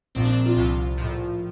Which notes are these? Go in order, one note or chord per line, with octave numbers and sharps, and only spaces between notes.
A#1 A#2 F3 C4
D4
F4
C2 C3 F3 F4
A#1 A2 F3